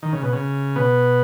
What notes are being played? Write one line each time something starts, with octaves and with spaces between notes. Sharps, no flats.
D#3
C#3
B2
C#3
B2 B3